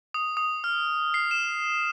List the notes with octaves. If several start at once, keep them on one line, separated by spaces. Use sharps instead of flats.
D#6
D#6
F6
C7
E7